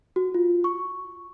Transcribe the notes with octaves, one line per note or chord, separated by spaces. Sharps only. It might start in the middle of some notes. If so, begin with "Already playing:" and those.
F#4
F4
C#6